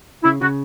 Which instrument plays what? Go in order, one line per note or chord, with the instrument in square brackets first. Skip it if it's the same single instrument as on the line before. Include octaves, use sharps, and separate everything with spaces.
[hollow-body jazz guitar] C#3 [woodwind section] E4
[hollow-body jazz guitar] C#3 [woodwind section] F#4